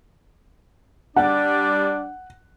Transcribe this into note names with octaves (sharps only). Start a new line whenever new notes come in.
G3 D4 D5 F#5